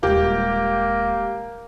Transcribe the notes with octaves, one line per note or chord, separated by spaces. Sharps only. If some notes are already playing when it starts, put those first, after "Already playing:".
D#1 G#3 A#3 G4